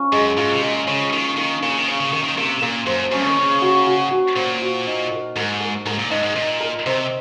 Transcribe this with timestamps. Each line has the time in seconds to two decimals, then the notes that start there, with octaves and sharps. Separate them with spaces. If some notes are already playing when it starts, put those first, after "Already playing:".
Already playing: C#4 F4
0.12 F#2 G#3
0.37 G#2 F4
0.51 C3
0.62 A#2 G#3
0.87 C#3 C#4
1.12 D#3 A#3
1.37 D#3 A#3
1.62 C#3 A#3
1.78 D#3
1.88 C#3 C#4
2.00 C#3
2.13 D#3 A#3
2.24 D#3
2.38 C3 A#3
2.62 A#2 A#3
2.86 F#2 C5
3.12 F#2 C#4
3.26 D#3
3.37 C#3 C#4
3.62 F#4
3.87 F#4
4.11 F#4
4.36 A#2 C5
4.62 F#4
4.87 D#4
5.11 A#4
5.36 G#2 A#4
5.61 A#4
5.86 G#2 A#4
5.99 A#2
6.11 G#2 D#4
6.23 G#2
6.36 A#2 D#4
6.60 A#4
6.86 C3 C5